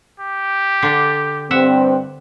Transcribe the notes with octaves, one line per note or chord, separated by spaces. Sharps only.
G4
D3 D4
G2 C4 E5 F#5